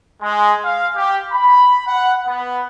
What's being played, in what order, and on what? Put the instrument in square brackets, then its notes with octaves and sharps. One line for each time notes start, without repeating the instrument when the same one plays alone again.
[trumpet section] G#3
F5
G4
B5
F#5
B3